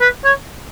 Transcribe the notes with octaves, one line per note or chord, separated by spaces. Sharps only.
B4
C#5